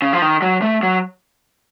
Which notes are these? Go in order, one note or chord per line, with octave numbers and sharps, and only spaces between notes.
C#3
F3
D#3
F#3
A3
F#3